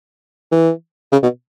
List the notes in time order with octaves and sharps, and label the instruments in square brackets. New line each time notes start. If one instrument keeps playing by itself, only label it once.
[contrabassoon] E3
C#3
B2